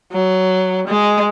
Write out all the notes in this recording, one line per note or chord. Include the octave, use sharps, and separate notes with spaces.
F#3
G#3